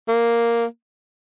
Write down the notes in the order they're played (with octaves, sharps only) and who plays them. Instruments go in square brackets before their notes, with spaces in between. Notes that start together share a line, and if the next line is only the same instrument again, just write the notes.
[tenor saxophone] A#3